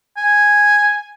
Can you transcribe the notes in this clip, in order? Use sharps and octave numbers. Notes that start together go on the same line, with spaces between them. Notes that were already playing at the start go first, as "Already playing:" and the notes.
G#5